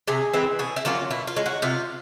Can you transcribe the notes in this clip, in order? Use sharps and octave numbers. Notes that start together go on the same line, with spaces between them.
C3 G#4
E3 G#3 C4
B2 G#4
E4
F#3 A#3 C#4 F4
B2 E4
F4
G#3 C#4
F#4
C3 F4